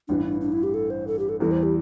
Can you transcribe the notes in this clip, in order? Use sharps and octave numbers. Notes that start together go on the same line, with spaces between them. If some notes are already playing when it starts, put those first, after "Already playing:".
A1 G2 E3 D4
D4
D4
E4
G4
A4
C5
A4
G4
A4
E2 E3 G3 A4
C5
G4